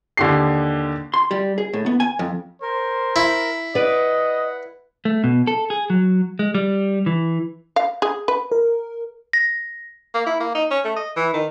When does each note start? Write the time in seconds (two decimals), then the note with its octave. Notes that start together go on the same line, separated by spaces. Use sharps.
0.17 D#2 D3 G4 C7
1.14 C6
1.31 G3
1.58 G#4
1.73 A2
1.86 B3
2.00 G#5
2.19 F2
2.62 A#4 C5
3.16 E4
3.75 B4 D5 D#5 F#5
5.05 A3
5.24 B2
5.47 A4
5.70 G#4
5.90 F#3
6.39 G#3
6.55 G3
7.06 E3
7.76 F5
8.02 G#4
8.28 B4
8.52 A#4
9.33 A#6
10.14 A#3
10.26 E4
10.40 A#3
10.55 D#4
10.71 C#4
10.85 A3
10.97 D#5
11.16 E3
11.34 D#3